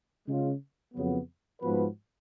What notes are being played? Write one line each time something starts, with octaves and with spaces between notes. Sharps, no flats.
C#3 G#3 C#4 F4
F2 C#3 F#3 B3
G#2 F3 B3 F#4 B4